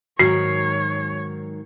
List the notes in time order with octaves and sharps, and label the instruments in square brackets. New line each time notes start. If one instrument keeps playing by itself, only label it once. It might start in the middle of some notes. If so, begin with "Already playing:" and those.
[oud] G#2 D#3 F#3 [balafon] F#4 [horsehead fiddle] C#5 [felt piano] C7